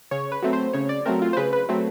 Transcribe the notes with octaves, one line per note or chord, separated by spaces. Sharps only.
C#3 C#5
B4
F#3 A3 C4
C5
C#3 C#5
D5
F#3 A3 C4 A#4
F4
C5
C#3 B4
B4
F#3 A3 C4